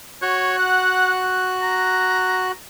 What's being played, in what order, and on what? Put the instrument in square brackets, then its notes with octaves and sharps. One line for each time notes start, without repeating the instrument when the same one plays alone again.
[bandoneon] F#4 F#6 [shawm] C#5
[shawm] F#5
A#5